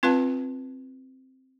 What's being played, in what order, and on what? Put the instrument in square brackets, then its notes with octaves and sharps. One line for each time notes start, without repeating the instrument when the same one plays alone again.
[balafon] C4 F4 B4 F5 A5